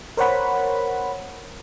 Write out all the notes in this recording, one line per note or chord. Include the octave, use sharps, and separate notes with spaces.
A#4 C5 C#5 F#5 B5